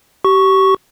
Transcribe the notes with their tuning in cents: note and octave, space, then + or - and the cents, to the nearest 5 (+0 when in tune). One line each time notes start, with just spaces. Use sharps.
G4 -30 C#6 +0